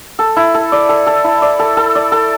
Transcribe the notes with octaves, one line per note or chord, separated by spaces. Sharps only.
A4
E4
A4
D5
A4
A4
E4
D5
A4
A4
D5
A4